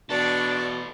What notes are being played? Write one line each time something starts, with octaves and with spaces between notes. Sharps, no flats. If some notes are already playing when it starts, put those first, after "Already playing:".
B2 E3 D4 A4 D5 C#6